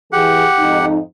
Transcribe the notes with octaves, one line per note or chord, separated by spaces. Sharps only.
E3 G4 G#4 F#5
F2 G#2 D#4